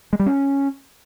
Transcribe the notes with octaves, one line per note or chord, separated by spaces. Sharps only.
G#3
G3
C#4